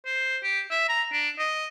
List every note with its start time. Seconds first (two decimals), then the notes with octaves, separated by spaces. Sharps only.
0.06 C5
0.44 G4
0.71 E5
0.89 A#5
1.12 D4
1.39 D#5